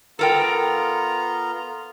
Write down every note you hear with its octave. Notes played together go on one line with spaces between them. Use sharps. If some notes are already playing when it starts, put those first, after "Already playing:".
B3 F4 A4 A#4 G5 A#5